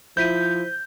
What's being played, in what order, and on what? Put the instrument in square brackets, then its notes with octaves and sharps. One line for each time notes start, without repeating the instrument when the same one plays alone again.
[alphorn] F3 [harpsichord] E4 [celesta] C5 B6 D#7 [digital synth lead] G6